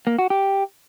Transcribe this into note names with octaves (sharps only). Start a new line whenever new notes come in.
A#3
F#4
G4